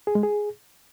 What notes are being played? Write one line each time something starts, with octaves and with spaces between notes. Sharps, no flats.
G#4
G#3
G#4